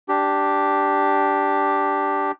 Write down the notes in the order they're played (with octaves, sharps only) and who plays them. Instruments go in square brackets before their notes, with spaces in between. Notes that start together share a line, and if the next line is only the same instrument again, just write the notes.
[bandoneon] D4 G4